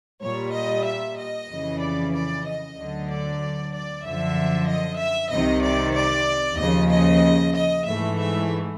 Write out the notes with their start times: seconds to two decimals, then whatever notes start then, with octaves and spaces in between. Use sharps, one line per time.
0.23 A#2 G3 C#5
0.54 D#5
0.86 E5
1.18 D#5
1.50 F2 C#3 E3
1.82 D5
2.14 D5
2.45 D#5
2.76 D2 D3 F#3
3.09 D5
3.72 D5
4.04 F#2 D3 F3 E5
4.68 D#5
4.99 E5
5.31 C2 C3 D#3 D#5
5.63 D5
5.95 D5
6.58 D#2 C#3 F3 D#5
6.90 D#5
7.54 D#5
7.85 G#2 E3 A3 E5
8.17 E5